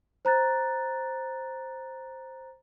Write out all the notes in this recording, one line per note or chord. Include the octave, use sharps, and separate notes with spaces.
C5 A#5 F#6 A6